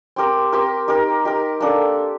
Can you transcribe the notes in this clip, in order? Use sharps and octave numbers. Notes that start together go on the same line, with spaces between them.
C4 G4 A#4
C4 G4 A#4
D#4 G4 A#4
D#4 G4 A#4
A#3 D4 A4